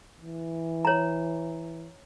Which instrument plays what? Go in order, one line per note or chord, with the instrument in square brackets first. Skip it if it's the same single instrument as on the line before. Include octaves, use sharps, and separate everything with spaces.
[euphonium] E3
[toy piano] C#5 A#5